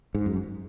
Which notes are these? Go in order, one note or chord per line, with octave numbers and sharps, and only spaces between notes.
G#2
F#2